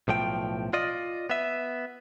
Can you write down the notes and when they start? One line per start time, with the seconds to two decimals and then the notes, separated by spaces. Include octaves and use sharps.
0.08 B1 A2 F3 G5
0.73 F4 D5 D#5
1.30 B3 E5